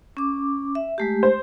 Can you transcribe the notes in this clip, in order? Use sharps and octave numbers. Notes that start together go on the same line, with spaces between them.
C#4 D6
E5
G#3 A3 G4
C5